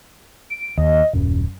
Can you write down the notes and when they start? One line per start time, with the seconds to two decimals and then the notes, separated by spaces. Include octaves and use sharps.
0.50 D7
0.78 D#2 D#5
1.13 D#1 F#2